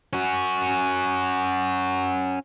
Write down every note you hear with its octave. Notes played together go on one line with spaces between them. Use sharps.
C#4 F#4